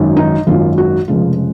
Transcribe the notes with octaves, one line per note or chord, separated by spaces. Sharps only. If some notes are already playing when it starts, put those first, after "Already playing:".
Already playing: G#1 F#2 D#3
D#4
G#1 F#2 D#3 F4
F#4
F1 F2 C#3 G#3 F4